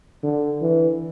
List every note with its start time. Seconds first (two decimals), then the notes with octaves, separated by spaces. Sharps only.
0.23 D3
0.62 E3